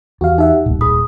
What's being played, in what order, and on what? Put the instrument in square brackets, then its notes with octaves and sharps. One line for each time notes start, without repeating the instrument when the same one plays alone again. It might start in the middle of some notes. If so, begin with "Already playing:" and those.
[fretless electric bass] E2 [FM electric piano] F#4 G4 F5
[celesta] D#4 [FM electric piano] G4 E5 F#5
[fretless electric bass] D#1 [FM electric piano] C2 A2
[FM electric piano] G#4 B5 [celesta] D#6